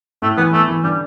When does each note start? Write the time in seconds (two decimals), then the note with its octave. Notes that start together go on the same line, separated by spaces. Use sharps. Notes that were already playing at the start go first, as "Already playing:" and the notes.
0.22 A2 A3
0.37 E3 B3
0.53 A3 B3
0.68 E3
0.83 D3 G3